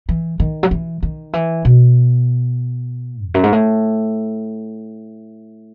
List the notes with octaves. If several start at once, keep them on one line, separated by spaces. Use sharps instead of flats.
E3
D#3
F#3
E3
D#3
E3
B2
E2
F#2
G#2
A2